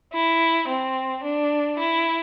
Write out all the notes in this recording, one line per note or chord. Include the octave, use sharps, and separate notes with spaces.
E4
C4
D4
E4